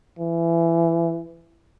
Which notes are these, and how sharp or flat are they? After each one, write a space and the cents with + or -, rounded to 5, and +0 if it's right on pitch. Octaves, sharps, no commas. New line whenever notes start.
E3 +25